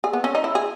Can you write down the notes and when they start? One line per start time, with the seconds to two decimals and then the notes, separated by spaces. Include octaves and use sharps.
0.04 G#4
0.13 B3
0.24 C#4
0.35 D#4
0.44 E4
0.55 G#4